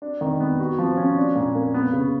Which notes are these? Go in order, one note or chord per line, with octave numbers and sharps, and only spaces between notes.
D4
D#3
B3
F#4
F3
C#4
D4
A#2
A#3
B3
C#3